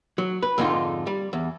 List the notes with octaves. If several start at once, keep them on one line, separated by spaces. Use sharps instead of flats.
F#3
B4
F2 G#2 D3 D#4 F4
G3
E2